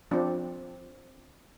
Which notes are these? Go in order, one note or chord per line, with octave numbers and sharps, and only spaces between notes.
F3 C4 D4